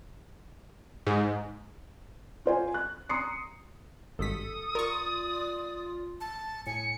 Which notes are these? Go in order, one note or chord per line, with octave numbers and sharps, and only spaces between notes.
G#2
F4 C5 G#5
F#6
A#5 C6 D#6 C7 C#7
G#1 G2 A4 D#6 B6
F4 A#4 D5 C#6
A5
A2 G#5 C#7